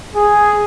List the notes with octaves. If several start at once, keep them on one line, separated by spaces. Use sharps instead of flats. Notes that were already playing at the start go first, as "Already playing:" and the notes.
G#4